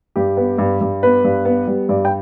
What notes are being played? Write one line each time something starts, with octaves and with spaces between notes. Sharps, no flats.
G2 G4
B3
G2
G2
B3 B4
G2
B3
G3
G2 D5
G5